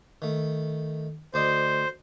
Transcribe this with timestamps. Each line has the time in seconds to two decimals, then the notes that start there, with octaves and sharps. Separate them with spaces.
0.22 D#3 A3
1.34 D2 C5 D5 D#5